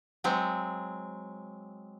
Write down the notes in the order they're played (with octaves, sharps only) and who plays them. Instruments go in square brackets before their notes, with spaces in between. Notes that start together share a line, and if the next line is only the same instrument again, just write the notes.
[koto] F#3 G#3 C4